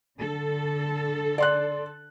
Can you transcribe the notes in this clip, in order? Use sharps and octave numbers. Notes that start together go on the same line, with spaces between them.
D3 A4
D5 C6 F#6